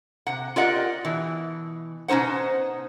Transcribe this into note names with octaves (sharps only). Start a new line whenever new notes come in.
C3 F#5
F4 G4 A#4 D5 D#5 F#5
B2 E3
B2 C#4 D#4 C5 F#5